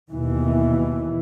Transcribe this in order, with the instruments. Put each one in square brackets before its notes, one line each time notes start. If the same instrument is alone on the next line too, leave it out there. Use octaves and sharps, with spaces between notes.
[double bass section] D#2 B2 E3